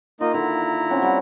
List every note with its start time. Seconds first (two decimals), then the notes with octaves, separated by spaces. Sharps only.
0.21 A#3 D#4 F4 D#5
0.33 D3 D#3 A#3 E4 A#5
0.89 C4 C#4 F#5
1.02 G3 F#5